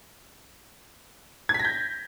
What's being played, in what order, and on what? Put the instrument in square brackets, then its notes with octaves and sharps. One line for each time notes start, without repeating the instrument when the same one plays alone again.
[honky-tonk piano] G#6
B6
A#6
G6